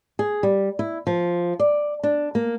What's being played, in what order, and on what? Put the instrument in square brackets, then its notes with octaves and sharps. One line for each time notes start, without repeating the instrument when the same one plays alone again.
[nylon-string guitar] G#4
G3
E4
F3
D5
D4
A#3